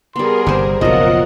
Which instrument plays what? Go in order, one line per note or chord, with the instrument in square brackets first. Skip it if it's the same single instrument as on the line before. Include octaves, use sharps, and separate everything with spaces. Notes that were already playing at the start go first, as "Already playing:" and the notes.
[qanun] G3 B3 [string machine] G#4 A#4 [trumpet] C6
[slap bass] G1 C3 [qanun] G4 C5
[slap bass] F#1 B1 [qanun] F3 F#3 [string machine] F4 A#4 F#5 [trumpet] D#5